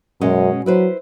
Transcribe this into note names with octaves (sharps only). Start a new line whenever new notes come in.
F#2 B2 G#3 C#4
F#3 E4 B4 C5